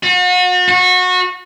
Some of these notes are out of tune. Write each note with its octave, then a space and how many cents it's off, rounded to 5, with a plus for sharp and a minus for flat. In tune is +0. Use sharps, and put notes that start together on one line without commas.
F#4 -40
F#4 -25